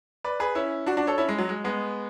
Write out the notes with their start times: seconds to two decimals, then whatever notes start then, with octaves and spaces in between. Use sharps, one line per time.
0.24 B4 D5
0.40 G#4 B4
0.55 C#4 E4
0.86 D4 F#4
0.97 D4 F#4
1.07 A4 C#5
1.18 C#4 E4
1.29 G#3
1.39 F#3
1.49 G#3
1.64 G#3 B3